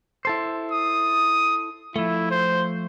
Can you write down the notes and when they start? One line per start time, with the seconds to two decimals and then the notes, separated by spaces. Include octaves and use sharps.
0.25 E4 A4 C5
0.72 D#6
1.96 F3 A3 E4
2.31 C5